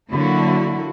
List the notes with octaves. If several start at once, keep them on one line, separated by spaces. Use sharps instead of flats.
D3 F#3 A#3 E4 F#4